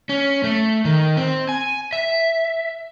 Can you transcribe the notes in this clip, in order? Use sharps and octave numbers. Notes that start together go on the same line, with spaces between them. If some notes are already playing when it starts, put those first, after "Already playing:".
C#4
A3
D#3
C4
G#5
E5